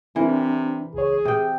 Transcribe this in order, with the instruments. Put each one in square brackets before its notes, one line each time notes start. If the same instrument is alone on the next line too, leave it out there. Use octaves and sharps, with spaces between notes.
[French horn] C3 [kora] E3 A#4 [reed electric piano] C4 D4
[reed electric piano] C#2 C#5 [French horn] G#4
[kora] C3 G5 [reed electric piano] D#6